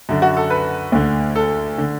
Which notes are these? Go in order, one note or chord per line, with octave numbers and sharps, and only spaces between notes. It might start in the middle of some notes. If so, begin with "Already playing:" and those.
F#2 D3
F#4
A4
B4
D2 D3
A4
D3